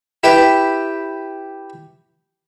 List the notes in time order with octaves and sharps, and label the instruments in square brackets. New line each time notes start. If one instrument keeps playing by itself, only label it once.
[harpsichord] E4 G4 B4